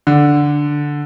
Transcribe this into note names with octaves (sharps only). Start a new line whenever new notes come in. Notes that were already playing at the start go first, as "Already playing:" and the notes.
D3